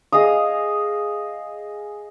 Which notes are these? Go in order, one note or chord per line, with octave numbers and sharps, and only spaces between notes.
G#4 D#5 F5 D#6